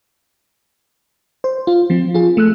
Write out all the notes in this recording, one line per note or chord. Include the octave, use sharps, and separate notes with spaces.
C5
F4
F3 C4
F4 G#4
A3 E6 F#6